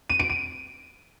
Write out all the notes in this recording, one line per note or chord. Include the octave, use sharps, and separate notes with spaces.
D#7
D7
D#7